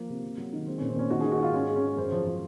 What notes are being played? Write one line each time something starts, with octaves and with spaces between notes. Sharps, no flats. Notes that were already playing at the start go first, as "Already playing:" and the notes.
Already playing: F3 A#3
C3
C3
F#3
D#3
G#3 C4
A#2 C#4
C4
A#2 C#4
D#3 F#4
D#3 G#4
F#4
G#2 F4
G#3 C#4
G#3
C#4
G#3 C#5
F#2 C5
F3
F3